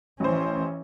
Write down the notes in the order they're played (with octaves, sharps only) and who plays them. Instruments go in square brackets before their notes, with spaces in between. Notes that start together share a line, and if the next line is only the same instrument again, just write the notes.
[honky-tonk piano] A1 C5 [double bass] E3 C#4